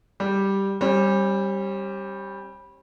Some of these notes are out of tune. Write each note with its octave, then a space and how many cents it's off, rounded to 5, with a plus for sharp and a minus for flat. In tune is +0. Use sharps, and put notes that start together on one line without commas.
G3 +0 G4 +0
G3 +0 C#4 -45